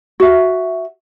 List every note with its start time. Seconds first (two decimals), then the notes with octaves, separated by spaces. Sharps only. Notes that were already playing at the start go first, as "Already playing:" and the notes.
0.20 F#4 E5